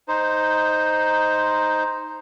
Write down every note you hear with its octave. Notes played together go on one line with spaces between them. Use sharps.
D#4 C5